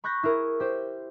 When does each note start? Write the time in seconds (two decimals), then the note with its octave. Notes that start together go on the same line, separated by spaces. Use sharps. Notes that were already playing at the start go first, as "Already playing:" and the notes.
0.04 B5 C#6 F#6 G6 A#6 B6
0.23 E4 G#4 A#4
0.60 G4 C5